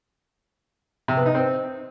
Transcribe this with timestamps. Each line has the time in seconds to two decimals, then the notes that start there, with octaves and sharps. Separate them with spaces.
1.08 C3
1.17 B3
1.26 D#4
1.35 C4